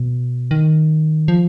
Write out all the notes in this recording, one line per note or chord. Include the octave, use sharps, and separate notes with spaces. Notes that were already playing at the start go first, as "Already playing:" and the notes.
Already playing: B2
D#3
F3